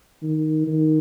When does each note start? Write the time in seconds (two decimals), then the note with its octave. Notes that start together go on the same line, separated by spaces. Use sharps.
0.23 D#3
0.67 D#3